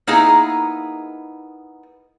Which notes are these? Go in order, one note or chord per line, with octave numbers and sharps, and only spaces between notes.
A#3 B3 D#4 E4 G#4